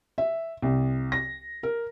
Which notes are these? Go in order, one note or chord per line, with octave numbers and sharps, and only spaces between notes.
E5
C2
A#6
A#4